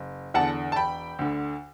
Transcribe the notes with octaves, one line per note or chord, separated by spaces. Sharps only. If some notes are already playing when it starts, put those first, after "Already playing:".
Already playing: F#1
E2 D3 F#5 A5
A5
E1 G5 B5
D2 D3